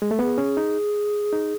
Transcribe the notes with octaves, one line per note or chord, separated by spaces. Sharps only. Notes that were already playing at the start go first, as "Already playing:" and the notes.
G#3
A3
B3 G#4
C#4
D#4
D#4